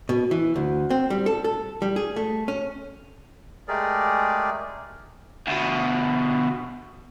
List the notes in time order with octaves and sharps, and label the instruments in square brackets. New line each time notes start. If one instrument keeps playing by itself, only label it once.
[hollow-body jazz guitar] B2
E3
D2
C4
G3
A4
A4
G3
G#4
A3
C#4
[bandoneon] G#3 A3 G4 G#4 A#4 D5
[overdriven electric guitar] D2 B2